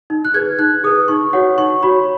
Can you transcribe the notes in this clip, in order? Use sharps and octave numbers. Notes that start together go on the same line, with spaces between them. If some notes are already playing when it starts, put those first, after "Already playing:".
D#4
F#6
G#4 B4 G#6
D#4 F#6
G#4 B4 D#6
D#4 C#6
F#4 C#5 F#5
D#4 C#6
F#4 C#5 B5